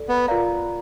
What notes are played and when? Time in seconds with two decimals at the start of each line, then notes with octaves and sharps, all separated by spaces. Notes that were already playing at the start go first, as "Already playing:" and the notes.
Already playing: A4 D5
0.09 B3
0.28 F4 A#4 D5 F5 A#5